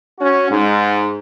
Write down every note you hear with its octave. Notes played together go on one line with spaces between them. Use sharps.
C#4 F#4
G#2